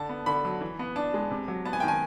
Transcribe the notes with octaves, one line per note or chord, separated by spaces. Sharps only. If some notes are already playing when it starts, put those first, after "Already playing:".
Already playing: D3 A5
B3
D3 B5
F#3
E3
B3
D4 A5
G#3
C3
F#3
B3 A5
G#5
D#3 G5
G#5